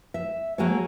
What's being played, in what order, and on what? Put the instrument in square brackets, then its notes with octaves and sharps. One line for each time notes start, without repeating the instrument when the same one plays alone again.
[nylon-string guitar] E5
F#3 A#3 F#4 G#4 A4 C#5